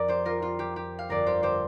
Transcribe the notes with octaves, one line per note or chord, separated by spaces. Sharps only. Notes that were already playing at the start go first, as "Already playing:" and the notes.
Already playing: F2 F3 A#4 D5
G4 C5
F4 A#4
F4
G4
G4
F5
G1 F2 F3 A#4 D5
G4 C5
G4 C5